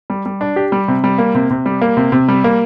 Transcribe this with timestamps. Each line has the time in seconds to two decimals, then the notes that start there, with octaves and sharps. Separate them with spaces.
0.10 G3
0.26 G3
0.41 D4
0.56 G4
0.72 G3
0.88 C3
1.04 G3
1.18 A#3
1.35 C3
1.51 C3
1.66 G3
1.82 A#3
1.97 C3
2.12 C3
2.29 G3
2.44 A#3